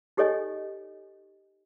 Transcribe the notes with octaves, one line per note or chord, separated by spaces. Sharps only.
D#4 G4 A4 C#5 D#5 G#5